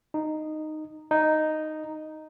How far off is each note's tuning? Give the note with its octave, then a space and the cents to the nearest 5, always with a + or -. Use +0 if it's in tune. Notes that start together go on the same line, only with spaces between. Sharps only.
D#4 -10
D#4 -5